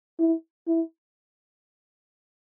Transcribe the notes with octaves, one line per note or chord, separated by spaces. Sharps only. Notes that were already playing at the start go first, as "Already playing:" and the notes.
E4
E4